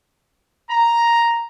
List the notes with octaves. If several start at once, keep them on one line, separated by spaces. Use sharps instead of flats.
A#5